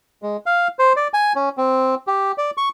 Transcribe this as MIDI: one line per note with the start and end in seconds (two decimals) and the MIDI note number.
0.22 0.37 56
0.46 0.68 77
0.79 0.93 72
0.96 1.08 74
1.14 1.33 80
1.36 1.49 61
1.57 1.95 60
2.07 2.32 67
2.38 2.51 74
2.57 2.69 85